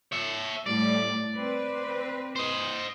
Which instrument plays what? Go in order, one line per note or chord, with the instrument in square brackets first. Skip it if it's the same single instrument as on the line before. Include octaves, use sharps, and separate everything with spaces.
[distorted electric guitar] C#5 E5
[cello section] A2 G3 [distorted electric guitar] D5
[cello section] C4 B4
[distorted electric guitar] C5 D#5